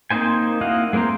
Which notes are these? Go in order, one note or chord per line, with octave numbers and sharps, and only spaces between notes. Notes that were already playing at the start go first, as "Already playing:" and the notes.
A#3 C4 D#4 C5 G#5
A#3 E4 F#4 D#5 F5
G#3 A#3 C4 C5 A#5